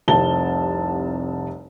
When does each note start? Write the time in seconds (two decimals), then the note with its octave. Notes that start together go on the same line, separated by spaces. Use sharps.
0.08 F1 C2 A5 G7